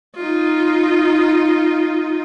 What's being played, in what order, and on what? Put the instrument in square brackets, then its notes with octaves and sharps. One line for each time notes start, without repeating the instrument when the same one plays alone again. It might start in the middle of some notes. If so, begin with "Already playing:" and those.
[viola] D#4 F4